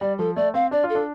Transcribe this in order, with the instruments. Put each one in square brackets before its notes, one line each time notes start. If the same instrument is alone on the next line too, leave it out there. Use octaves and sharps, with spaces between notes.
[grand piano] G3 [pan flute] D5
[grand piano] F3 [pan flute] A4
[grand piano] A3 [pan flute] D5
[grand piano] C4 [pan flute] F5
[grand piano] D4 [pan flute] D5
[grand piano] F4
[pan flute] A4
[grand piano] D4